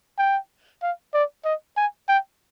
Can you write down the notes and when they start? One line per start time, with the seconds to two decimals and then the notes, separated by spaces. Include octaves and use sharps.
0.18 G5
0.82 F5
1.14 D5
1.44 D#5
1.77 G#5
2.08 G5